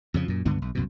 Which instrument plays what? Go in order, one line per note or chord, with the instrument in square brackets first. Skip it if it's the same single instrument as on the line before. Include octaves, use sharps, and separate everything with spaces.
[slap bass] F2 C#3 F3
F#2 A#2
C#2 G2 D3 B3
B1
C2 F#2 B2